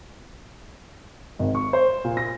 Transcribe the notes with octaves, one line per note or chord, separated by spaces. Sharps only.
G#1
C#6
C5
A#2
A#6